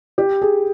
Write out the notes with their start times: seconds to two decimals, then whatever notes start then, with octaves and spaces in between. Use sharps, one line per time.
0.18 G4
0.42 G#4